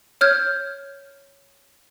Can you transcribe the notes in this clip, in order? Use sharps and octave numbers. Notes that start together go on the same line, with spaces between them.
C#5 F6 G6 G#6